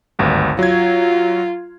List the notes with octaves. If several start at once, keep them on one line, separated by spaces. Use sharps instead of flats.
G#1 D2 G2
F#3 F4 G#6